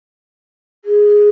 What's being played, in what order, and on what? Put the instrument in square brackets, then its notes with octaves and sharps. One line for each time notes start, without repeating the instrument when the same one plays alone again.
[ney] G#4